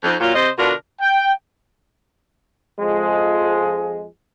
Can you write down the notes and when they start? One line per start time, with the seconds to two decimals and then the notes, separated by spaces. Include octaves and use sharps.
0.03 F2 D#4
0.20 A#2 F#3 F4
0.34 C3 C5 D#5
0.57 B2 D3 D4 F4 F#4 A#4
1.01 G5
2.79 F2 F3 G#3